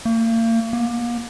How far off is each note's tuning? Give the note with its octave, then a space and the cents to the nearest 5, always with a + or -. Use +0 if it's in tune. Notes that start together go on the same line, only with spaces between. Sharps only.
A#3 -40
A#3 +35